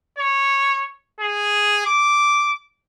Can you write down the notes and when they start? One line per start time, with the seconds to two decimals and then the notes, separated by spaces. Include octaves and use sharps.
0.18 C#5
1.20 G#4
1.86 D6